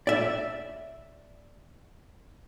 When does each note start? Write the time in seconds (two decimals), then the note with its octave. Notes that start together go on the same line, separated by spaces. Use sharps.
0.07 D5 E5